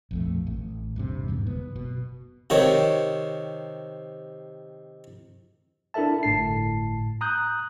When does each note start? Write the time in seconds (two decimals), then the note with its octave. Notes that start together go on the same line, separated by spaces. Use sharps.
0.11 A#1 F2 A3
0.47 A1
0.96 D#1 G2 C3
1.28 E2 G#2 B2
1.47 F#1 B3
1.76 B2
2.50 C3 D#3 C#5
5.94 D4 E4 A4 A#4 E5 A5
6.23 G1 A2 A5 C7
7.21 A#5 D#6 F#6 G6